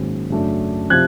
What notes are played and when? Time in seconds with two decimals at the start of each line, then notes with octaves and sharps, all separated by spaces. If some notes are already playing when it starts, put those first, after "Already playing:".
Already playing: G#2 D#3 F#3 A#3 C#4
0.30 F#2 C#3 F#3 A3 D4
0.90 C3 F3 F#6 G#6